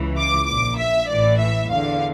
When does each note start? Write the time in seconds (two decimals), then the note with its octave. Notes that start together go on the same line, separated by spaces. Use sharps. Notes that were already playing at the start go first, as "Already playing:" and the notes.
Already playing: C#2 C#3 E3
0.18 D6
0.47 A#1 A#2 D6
0.78 E5
1.09 A1 A2 E3 D5
1.40 E5
1.70 E2 D3 F5